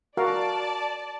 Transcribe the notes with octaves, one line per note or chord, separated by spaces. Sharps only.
F#4 A#4 D5 F5 A5